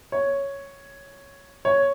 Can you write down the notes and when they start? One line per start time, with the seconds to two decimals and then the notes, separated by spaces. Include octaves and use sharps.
0.12 C#5
1.65 C#5